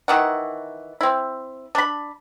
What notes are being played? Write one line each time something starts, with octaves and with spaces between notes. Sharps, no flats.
D#3 E3 F#5
C4 E4
D4 B5